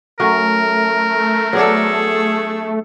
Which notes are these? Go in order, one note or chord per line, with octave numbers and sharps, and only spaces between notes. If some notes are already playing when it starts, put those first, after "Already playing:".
F#3 A3 C#4 F#4 A#4
F#3 B3 D4 G#4 A4